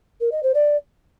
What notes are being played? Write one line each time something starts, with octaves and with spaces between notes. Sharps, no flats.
A#4
D#5
C5
D5